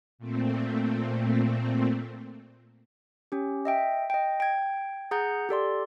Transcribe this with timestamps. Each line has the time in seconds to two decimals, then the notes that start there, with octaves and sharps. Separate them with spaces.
0.18 A#2 A3 C4
3.32 C#4 G4
3.65 D#5 E5 G5
4.10 D#5 G5
4.40 G5 G#6
5.11 G#4 F#5 A#5 G6
5.49 G4 A4 D5 C6